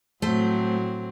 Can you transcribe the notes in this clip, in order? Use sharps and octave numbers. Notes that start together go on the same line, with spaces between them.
A2 F#3 A3 C4 C5